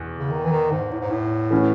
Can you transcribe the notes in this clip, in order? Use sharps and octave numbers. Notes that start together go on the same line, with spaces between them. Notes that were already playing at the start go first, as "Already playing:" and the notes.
Already playing: E2 B2
C#3
D#3
E3
D#3
G#2
A2
G#2
A2
E3 A3 C#4 F#4 B4